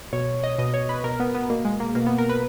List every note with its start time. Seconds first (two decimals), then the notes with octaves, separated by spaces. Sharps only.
0.13 B2 C#5
0.44 D#5
0.58 B2 D#5
0.74 C#5
0.89 B4
1.04 B2 A#4
1.20 B3
1.35 B3
1.49 B2 A#3
1.65 G#3
1.80 A#3
1.95 B2 A#3
2.06 B3
2.18 A#4
2.29 B4